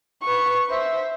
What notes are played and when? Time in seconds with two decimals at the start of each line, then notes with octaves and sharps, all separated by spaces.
0.22 B4 C#6
0.69 C5 E5